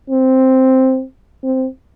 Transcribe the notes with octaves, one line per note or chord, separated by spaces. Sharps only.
C4
C4